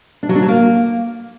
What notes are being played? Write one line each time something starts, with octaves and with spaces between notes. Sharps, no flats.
D4
F#3
D4
F#3
A#3